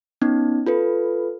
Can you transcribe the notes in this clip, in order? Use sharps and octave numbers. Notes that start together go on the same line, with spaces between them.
B3 C#4 D#4
F4 A4 B4